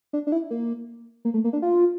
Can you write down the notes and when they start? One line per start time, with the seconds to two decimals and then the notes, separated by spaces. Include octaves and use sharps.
0.13 D4
0.27 D4
0.32 E4
0.50 A#3
1.25 A#3
1.34 A3
1.44 A#3
1.53 D4
1.62 F4